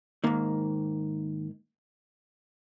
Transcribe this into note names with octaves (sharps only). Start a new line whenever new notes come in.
G#2 D#3 A#3